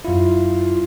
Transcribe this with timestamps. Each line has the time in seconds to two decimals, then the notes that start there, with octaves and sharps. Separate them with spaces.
0.05 F#2 E4 F4